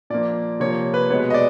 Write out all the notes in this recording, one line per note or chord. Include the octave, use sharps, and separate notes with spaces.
A#2 F3 A#3 D5
C3 F3 A#3 C#5
B4
B2 G#3 B3 C#5
D#5
D5